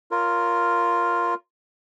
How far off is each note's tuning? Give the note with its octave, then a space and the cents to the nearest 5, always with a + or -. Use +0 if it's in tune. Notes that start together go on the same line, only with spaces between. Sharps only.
F4 +0 A#4 +0 C#5 +15